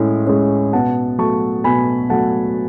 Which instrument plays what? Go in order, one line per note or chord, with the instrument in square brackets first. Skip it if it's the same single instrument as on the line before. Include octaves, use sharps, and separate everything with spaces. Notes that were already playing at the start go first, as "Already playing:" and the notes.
Already playing: [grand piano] A2 G#3 C#4
G#3 C#4
B2 F#5 A5
F#3 A3 A5 C#6
B2 G#5 B5
F#3 A3 F#5 A5